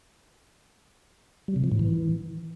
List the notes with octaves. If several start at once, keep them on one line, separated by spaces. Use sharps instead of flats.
G3
C3
F3
A2
E3